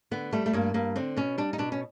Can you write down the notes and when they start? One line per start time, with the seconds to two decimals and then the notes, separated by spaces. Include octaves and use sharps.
0.11 D3 B3
0.33 G3 A3
0.46 A3
0.53 G2 A#3
0.74 G2 A#3
0.96 D3 C4
1.16 B2 C#4
1.38 G3 D4
1.53 D#4
1.58 B2 D4
1.72 C#4